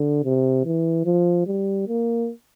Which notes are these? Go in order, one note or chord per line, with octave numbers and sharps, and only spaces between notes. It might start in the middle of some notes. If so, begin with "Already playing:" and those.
Already playing: D3
C3
E3
F3
G3
A#3